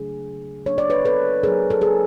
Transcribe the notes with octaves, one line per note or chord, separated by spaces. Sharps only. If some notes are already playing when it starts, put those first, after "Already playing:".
Already playing: C#3 F#3 A3 D4 G#4
F#3 A#3 D4 C#5
D5
B4 C#5
A4 B4
F#3 A#3 D4 G#4 A#4
A4
G#4 A#4